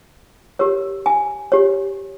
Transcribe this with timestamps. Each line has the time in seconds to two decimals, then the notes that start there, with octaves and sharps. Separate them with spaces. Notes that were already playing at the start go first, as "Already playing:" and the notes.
0.59 G4 A#4 C#5
1.06 G#5
1.52 G4 C#5